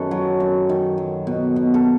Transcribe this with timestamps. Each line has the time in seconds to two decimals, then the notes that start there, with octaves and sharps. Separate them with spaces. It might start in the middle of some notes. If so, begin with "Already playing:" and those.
Already playing: F#2 D#3 A4 B4
0.11 F#3
0.40 F#2
0.69 D#3
0.98 F#3
1.27 B2
1.56 B2
1.74 A4